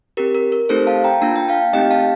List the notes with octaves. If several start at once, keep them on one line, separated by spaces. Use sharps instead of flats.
C4 G4 A#4
A#4
A#4
A3 C4 D#4 G4 A4 C5
F5 A5
G5 A#5
A#3 D4 F4 A5
G5
F5 A5
A3 C4 D#4 G4 D#5 G5
F5 A5